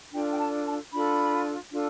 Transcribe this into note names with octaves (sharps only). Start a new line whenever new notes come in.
D4 F4 A4 G5
G5
A5
A5
D4 F4 A4 B5
D4 F4 A4